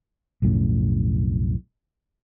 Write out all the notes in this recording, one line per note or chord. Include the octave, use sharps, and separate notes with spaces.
B1 F2 A2 C#3